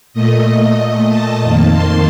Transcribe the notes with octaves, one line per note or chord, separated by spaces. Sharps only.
A#2 A3 D#5
A5
F2 D#3 A#3
C6